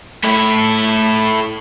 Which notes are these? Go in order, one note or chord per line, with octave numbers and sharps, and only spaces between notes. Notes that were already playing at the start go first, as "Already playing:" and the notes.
A3 E4